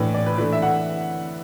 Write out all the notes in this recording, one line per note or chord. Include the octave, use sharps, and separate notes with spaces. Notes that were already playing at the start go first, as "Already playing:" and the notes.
Already playing: A2 E3 D4
D5
B4
E3 A3 D4 B4
E5
F#5